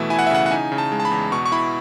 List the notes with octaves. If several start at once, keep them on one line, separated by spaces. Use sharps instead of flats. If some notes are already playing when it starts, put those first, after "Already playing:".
Already playing: B2 E3 A3 E5
E4 G#5
F#5
E5
C#3 F#5
F#5
D#4 G#5
C#3
A5
G#3
A5
B5
E2
B2 C#6
C#6
E4 B5